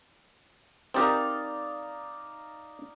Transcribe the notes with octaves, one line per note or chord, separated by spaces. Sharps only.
C4 D#4 G4 A#4 D5 F5